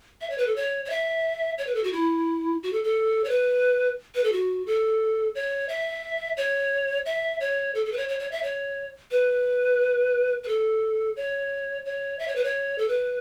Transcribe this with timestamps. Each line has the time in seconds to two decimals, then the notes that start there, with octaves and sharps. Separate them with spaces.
0.21 E5
0.30 C#5
0.38 B4
0.47 A4
0.56 C#5
0.85 C#5
0.90 E5
1.58 C#5
1.67 B4
1.75 A4
1.84 F#4
1.93 E4
2.63 F#4
2.73 A4
2.84 A4
3.24 C#5
3.29 B4
4.15 B4
4.24 A4
4.32 F#4
4.67 A4
5.35 C#5
5.69 E5
6.37 C#5
7.06 E5
7.40 C#5
7.75 A4
7.85 A4
7.92 B4
7.97 C#5
8.09 C#5
8.19 C#5
8.31 E5
8.43 C#5
9.11 B4
10.43 B4
10.48 A4
11.16 C#5
11.85 C#5
12.19 E5
12.28 C#5
12.36 B4
12.44 C#5
12.78 A4
12.88 B4